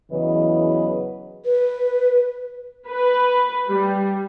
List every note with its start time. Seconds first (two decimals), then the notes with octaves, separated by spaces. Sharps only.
0.12 E2 C#3 E3 F#3 B4 D#5
1.45 B4
2.91 B4
3.69 G3